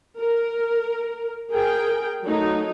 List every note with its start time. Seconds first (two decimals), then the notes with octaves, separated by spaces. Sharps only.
0.18 A#4
1.51 G#4 A#4 G5
2.23 F#3 A3 D#4